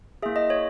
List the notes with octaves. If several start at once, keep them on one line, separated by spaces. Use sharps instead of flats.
A#3 E4 G#4 E5
D#5
C#5